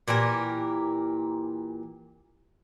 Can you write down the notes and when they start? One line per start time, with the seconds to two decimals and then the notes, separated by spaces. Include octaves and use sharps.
0.08 A#2 E3 G4 A#4